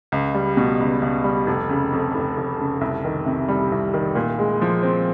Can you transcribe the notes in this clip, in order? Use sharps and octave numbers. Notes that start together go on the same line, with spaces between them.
C#2
G3
B2
C#2
C#2
G3
F1
C#3
F2
F1
F1
C#3
C2
D#3
C3
G3
C2
D#3
A#2
G#3
F3
C4